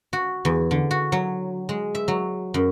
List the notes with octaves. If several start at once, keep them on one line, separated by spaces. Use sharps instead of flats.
F#4
E2
D3
F#4
F#3
G#3
E5
F#3
F#2